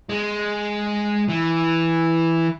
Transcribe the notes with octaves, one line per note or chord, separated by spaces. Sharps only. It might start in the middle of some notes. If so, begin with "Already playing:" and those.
G#3
E3